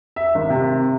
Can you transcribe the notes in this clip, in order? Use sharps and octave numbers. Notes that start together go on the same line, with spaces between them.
E5
G#1
C3